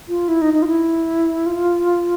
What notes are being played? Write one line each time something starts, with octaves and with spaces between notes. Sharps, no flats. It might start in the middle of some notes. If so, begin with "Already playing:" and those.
F4
E4
D#4
D#4
F4
E4
F4